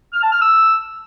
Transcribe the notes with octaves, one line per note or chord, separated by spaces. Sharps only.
F6
A5
F6
E6